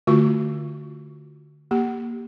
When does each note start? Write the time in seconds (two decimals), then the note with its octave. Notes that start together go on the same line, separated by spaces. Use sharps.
0.07 D3 A3 F4 F#4 C#6
1.71 A#3 G4